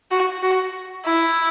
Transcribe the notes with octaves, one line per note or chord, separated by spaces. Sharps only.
F#4
F#4
E4